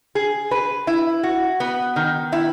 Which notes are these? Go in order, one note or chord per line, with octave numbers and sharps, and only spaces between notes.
G#4
B4
E4
F#4
B3
D#3
E4